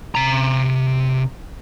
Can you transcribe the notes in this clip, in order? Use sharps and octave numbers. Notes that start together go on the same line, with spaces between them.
C3 A#5